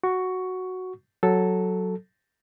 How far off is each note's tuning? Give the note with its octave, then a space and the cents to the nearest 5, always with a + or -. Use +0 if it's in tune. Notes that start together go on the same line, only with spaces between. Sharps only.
F#4 +0 C#6 +10
F#3 +0 A4 +0